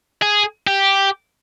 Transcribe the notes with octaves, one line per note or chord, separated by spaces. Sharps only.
G#4
G4